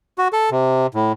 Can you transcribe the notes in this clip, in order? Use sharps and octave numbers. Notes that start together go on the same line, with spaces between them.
F#4
A4
C3
A2